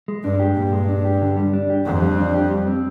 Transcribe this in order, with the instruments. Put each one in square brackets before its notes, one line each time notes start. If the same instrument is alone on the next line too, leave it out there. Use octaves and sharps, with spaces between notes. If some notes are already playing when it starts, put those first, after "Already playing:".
[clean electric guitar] G#3
[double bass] G2 [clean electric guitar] D4
[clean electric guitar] G4
[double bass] G2 [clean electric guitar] A#2
[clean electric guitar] G#3
D4
G4
D3
G3
D4
G4
[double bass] F2 [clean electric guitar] D3
[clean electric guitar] G3
D4
G4
G3
C4